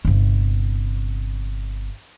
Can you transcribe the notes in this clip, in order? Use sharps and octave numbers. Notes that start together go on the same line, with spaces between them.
G1 C3